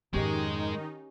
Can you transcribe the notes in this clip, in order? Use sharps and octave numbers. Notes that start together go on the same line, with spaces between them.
F2 G#2 D#3 G#3 C#4 D#4 G4